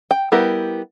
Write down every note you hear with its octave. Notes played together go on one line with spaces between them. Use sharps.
G5
G3 B3 E4 G4 A#4